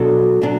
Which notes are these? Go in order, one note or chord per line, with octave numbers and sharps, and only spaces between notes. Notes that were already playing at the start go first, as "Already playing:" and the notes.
Already playing: B2 F#3 D4 A4
B2 F#3 D4